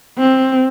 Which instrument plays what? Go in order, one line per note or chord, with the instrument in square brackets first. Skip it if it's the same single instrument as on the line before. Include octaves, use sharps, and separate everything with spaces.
[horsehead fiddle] C4